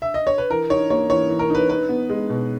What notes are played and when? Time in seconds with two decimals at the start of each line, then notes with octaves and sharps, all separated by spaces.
0.02 E5
0.14 D#5
0.27 C#5
0.38 B4
0.50 E3 A#4
0.70 D#4 C#5
0.90 A#3 C#5
1.10 E3 C#5
1.29 E3
1.39 A#4
1.50 D#4 B4
1.69 D#4 B4
1.89 B3
2.10 G#3
2.29 B2